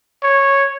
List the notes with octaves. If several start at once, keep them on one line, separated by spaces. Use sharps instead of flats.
C#5